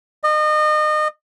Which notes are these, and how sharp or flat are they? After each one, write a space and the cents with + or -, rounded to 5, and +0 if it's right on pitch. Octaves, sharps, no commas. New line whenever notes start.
D#5 -30